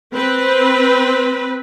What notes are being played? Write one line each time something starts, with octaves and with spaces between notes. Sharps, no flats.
C4 B4